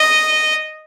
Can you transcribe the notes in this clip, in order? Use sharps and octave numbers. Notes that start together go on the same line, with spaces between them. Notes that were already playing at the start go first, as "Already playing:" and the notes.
Already playing: D#5